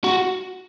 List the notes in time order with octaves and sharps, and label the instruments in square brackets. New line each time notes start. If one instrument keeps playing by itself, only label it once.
[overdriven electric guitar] F#4